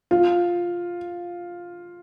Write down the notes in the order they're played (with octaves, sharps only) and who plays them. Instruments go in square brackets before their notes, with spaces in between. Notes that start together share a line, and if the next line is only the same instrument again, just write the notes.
[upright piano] F4